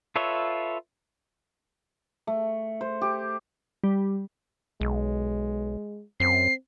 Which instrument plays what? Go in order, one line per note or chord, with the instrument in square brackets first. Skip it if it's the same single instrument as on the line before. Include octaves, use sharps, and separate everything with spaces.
[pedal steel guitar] F4 A4 B4 C#5 E5
[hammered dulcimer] A3
C5
G4
[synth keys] G3
[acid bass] B1 [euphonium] G#3
[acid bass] F#2 [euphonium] C4 [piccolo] C7